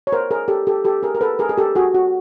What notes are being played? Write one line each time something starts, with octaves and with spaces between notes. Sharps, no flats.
C#5
A#4 C5
G#4 A#4
G4 A4
G4 A4
G4 A4
G#4 A#4
A#4
A4 B4
G#4 A#4
G#4
G4 A4
F#4 G#4
F#4